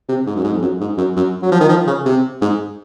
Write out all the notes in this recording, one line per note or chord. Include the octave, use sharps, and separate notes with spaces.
C3
G#2
F#2
G#2
F2
F#2
G#2
F#2
F#2
F#3
F3
D#3
F3
C#3
C3
G#2